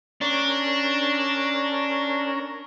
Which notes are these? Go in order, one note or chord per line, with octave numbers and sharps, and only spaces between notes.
C#4 D4 A#4